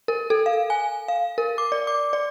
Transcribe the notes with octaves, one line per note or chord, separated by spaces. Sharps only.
A#4
A4
F5
G#5
F5
A#4
D6
D5
D6
D5